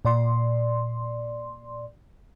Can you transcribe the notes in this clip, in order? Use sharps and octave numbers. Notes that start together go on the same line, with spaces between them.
A#2 D5 C6